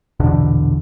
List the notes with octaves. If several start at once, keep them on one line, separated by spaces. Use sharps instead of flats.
A#1 E2 B2 D3